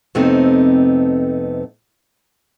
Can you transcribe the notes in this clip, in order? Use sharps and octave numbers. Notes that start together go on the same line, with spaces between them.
F2 C3 A3 B3 C4 D#4